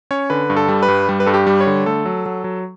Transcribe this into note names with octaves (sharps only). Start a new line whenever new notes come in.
C#4 C#5
D3 B4
G2
A4
G3
B4
G2
G3
B4
G2 A4
G4
G3
C#5
D3
A3 A4
F#3
F#3
F#3